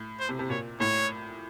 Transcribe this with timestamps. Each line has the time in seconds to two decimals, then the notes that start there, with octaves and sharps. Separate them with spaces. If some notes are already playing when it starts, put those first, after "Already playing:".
Already playing: A2
0.19 C5
0.29 C3
0.39 C3
0.50 A#2 C#5
0.80 A2 C#5